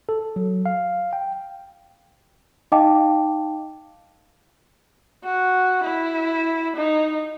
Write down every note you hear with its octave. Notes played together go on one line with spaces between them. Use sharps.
A4
F#3
F5
G5
D#4 D#5 F5 G5 A5 D6
F#4
E4
D#4